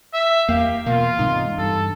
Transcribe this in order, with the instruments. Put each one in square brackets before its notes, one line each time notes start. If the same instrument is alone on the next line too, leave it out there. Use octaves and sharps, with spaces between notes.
[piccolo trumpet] E5
[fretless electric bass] E2 [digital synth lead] A#3 [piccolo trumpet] G4 [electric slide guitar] F5
[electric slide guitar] E2 F5 [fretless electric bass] B2 [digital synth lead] A#3 [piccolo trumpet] F4
[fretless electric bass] G#2 C3 G#3 [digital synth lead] D#4
[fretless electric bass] G2 [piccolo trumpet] A4